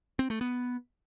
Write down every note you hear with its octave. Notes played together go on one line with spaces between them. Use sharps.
C4
A3
B3